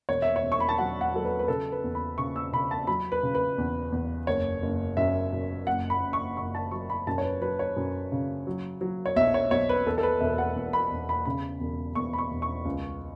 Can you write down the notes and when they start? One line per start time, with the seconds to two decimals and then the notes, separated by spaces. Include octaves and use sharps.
0.09 E1 C#5
0.22 E5
0.36 C#5
0.43 E1
0.52 C#6
0.60 B5
0.69 A5
0.78 F#3 F#5
1.01 F#5
1.14 F#3 A4
1.25 B4
1.39 B4
1.48 C#3 A4
1.72 B4
1.84 E2
1.95 B5
2.18 C#3 C#6
2.36 E6
2.52 C#3 B5
2.71 A5
2.87 F#3 B5
3.12 B4
3.23 C#3
3.35 B4
3.58 E2
3.92 E2
4.27 F#1 C#5
4.62 F#1
4.97 F#2 E5
5.33 F#2
5.67 F#1 F#5
5.90 B5
6.03 F#1
6.13 C#6
6.37 F#1 C#6
6.55 A5
6.71 F#3 C#6
6.90 B5
7.07 F#2 A5
7.18 C#5
7.24 B4
7.41 F#3 B4
7.59 C#5
7.76 F#2
8.12 C#3
8.47 F#3
8.81 F#3
9.06 C#5
9.16 B1 E5
9.34 C#5
9.51 B1 C#5
9.69 B4
9.86 E2 A4
9.98 A4
10.03 B4
10.21 E1 E5
10.38 F#5
10.56 E2
10.73 B5
10.91 E1
11.09 B5
11.25 C#3 B5
11.60 E1
11.95 E2 C#6
12.13 B5
12.18 C#6
12.31 E1
12.42 C#6
12.65 C#2